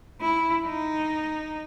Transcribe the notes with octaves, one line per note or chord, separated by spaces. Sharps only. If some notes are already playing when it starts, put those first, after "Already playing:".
E4
D#4